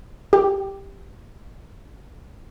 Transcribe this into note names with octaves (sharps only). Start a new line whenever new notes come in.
G4 G5